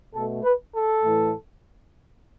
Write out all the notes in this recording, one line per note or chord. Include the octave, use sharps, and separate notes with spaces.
B2 A3 A4
B4
A4
A2 E3 A3